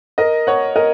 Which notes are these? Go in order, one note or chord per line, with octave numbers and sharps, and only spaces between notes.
A#4 D#5
C#5 F#5
A#4 D#5